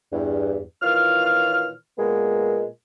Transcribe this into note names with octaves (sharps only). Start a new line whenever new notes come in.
E2 G2
A#2 D#3 E3 F4 C#5 F6
A#2 G#3 A#3 B3